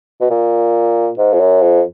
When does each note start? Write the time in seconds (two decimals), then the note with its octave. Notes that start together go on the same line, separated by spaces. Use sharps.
0.21 B2
0.30 A#2
1.18 G#2
1.33 F2
1.40 F#2
1.62 F2